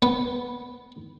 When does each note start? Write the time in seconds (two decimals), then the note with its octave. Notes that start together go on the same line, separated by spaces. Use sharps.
0.02 B3